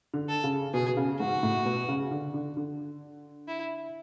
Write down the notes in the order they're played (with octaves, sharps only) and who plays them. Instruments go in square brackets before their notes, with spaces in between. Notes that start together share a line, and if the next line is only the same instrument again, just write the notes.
[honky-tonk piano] D3
[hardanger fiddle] A4
[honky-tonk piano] C#3
[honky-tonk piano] B2 [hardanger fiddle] G#4
[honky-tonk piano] B2
C#3
[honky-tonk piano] G#2 [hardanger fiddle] F#4
[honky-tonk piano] A2
B2
C#3
D3
D3
D3
[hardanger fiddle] E4